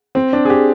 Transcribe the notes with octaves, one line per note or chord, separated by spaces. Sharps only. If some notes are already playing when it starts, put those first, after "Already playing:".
C4
D4
G#4
G4